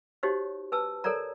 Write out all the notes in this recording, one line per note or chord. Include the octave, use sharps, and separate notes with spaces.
D#4 F#4 G4 C5 C#5
B4 G#5 A5 E6
A4 A#4 C#5 D5 A#5